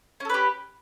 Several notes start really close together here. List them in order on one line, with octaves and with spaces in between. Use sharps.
C#4 A4 B4 G4